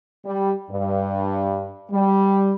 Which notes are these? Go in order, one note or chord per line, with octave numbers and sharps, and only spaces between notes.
G3
G2
G3